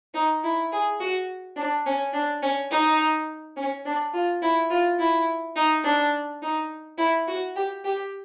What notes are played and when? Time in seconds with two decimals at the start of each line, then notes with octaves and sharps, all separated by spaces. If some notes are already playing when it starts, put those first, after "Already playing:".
0.14 D#4
0.44 E4
0.72 G#4
1.00 F#4
1.56 D4
1.86 C#4
2.13 D4
2.42 C#4
2.71 D#4
3.57 C#4
3.85 D4
4.14 F4
4.42 E4
4.70 F4
4.99 E4
5.56 D#4
5.84 D4
6.42 D#4
6.98 E4
7.27 F#4
7.56 G4
7.84 G4